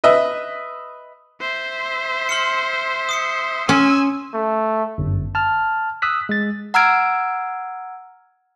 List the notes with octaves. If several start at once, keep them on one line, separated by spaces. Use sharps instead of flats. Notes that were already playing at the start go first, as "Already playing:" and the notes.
B4 D#5 E5
C5 E5
C6 F6 C#7
D#6 C7 C#7
C#4 G#5 C6 E6
A3
G1 F#2
A5 F6
D#6 E6 F#6 B6
G#3 A6
F#5 A#5 E6 F6 G#6 D7